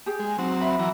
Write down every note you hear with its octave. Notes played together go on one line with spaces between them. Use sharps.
G4 G#4
G#3
F#3 C4 D#4
E5 B5
E3 F#3 A#5